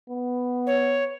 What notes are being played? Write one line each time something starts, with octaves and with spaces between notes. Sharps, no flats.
B3
C#5